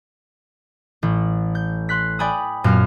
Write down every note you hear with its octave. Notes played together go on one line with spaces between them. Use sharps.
A1
G6
C6 F#6 B6
D5 G5 G#5 B5 D#6
F#2 A#2 B3 F6